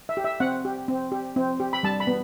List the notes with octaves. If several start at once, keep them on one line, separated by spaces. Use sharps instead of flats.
E5
G4
E5
C4 F#5
G4
C4
G4
C4
G4
B5
G3 A5
B5
B3